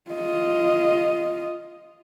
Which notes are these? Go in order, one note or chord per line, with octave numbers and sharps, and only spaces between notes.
F4 D#5